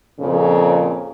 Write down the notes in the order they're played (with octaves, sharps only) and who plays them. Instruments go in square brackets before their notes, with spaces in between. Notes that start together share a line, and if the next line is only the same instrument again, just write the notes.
[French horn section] F2 A#2 C#3